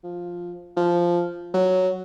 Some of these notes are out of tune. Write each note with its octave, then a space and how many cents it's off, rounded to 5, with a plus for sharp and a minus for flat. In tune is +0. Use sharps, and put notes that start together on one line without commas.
F3 +5
F3 -5
F#3 +0